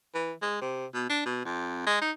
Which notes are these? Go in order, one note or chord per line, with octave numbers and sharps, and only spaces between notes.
E3
G#3
C3
B2
D4
B2
F2
G#3
D#4